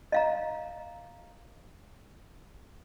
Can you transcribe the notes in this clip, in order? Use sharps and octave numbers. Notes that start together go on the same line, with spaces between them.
D#5 F5 A#5